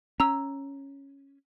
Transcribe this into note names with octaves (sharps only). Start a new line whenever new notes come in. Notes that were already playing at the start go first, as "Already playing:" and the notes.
C#4 A#5 E6